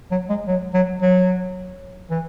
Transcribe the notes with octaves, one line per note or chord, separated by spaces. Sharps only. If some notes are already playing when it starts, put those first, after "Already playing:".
F#3
G#3
F#3
F#3
F#3
E3